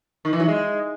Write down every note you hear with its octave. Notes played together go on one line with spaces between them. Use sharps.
D#3
E3
F#3
G#3